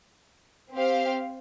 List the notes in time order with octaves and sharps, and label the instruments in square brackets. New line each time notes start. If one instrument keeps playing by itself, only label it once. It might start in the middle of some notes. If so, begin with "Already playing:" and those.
[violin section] C4 G4 C5 F5